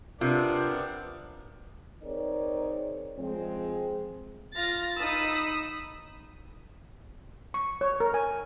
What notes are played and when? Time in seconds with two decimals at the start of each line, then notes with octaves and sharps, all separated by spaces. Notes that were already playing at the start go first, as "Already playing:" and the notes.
0.21 C3 B3 C4 D4 F4 A#4
2.03 C4 D#4 G#4 A#4 C#5 D5
3.18 F3 G#3 C4
4.56 F4 F6 A6 A#6
4.97 D#4 B5 D#6 E6
7.54 C#6
7.81 C#5
8.00 A#4
8.14 G#5